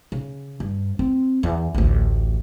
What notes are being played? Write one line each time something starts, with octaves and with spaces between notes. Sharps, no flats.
C#3
G2
C4
E2
A1 D2